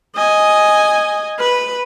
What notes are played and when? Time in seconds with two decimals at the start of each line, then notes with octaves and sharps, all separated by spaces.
0.15 D#5 G#5
1.39 B4